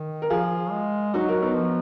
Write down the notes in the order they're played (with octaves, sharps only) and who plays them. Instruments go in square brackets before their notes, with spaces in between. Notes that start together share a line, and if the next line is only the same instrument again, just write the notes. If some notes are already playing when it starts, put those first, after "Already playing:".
Already playing: [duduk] D#3
[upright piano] A#4
[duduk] F3 [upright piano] F4 G#4
[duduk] G#3
[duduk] F#3 [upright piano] D#4 F#4
[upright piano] F#4 A#4
B3 D#4
[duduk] F3